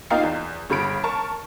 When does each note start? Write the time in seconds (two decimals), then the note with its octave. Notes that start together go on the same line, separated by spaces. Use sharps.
0.10 A#3 D#4 F4 F5 G5 C7
0.23 E2
0.70 G1 C#3 B5 D7
1.04 A#4 A5 C#6